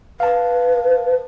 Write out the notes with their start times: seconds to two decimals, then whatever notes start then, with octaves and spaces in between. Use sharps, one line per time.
0.20 B4 F5 A5